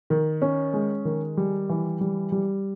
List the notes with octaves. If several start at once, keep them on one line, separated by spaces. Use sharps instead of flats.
D#3
C#4
G#3
D#3
G3
E3
G3
G3